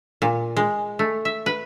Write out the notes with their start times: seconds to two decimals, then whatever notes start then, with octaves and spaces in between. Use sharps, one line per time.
0.22 A#2
0.57 G#3
0.99 A3
1.25 E5
1.46 B4